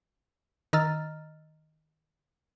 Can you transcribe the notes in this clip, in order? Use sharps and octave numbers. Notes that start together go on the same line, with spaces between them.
D#3 D#5 A#5 E6 F6 A6